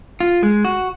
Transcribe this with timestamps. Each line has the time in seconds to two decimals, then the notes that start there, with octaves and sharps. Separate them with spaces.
0.20 F4
0.43 G#3
0.65 F#4